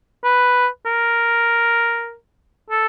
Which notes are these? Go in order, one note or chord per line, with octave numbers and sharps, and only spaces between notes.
B4
A#4
A4